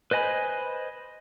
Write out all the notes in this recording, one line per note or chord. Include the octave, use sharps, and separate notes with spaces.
B4 C5 D#5 G#5 B5